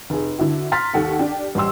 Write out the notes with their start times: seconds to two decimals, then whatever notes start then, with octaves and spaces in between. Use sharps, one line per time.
0.10 F1 G#4
0.38 D3 E4 F#4
0.72 A#5 C6 F6 A6 B6
0.94 D#2 D#3 A4 F#5
1.19 D4 G4
1.55 A1 G3 C6 E6